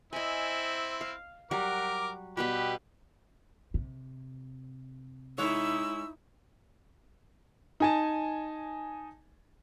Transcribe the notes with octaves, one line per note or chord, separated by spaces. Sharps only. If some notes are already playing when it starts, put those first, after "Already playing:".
C4 E4 D#5 G#5
F5
F#3 G3 F#4 A#4 D6
B2 G3 B3 G4 B4
C3
G#3 D#4 E4 C#5 E6
D#4 G#5 A5